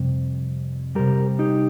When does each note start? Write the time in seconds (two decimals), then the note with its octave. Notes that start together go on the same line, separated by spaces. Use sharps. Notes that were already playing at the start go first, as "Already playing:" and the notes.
Already playing: F2 C3 G3
0.95 C3 G3 G4 A#4
1.39 D#4 G4